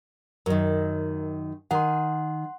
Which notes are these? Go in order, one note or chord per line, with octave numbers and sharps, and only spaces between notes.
F#2 D#3 A#4 D#5
D#3 F#5 G#5 C6